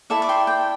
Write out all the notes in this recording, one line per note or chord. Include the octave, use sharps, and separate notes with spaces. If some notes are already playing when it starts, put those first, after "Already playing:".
E4 A4 D5 E5 A5
D6
G5 C6
G5